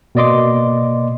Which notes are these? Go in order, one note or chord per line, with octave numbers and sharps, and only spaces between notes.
B2 A#3 D5 D#5 C6 D6